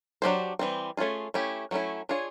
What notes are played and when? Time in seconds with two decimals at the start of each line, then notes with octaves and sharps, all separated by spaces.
0.22 F#3 A3 D4 G4 C5
0.59 E3 G3 C4
0.97 A3 C#4 F4 G#4
1.34 A3 C#4 E4 G4
1.71 F#3 A3 C#4 E4
2.09 D4 F4 G#4 C#5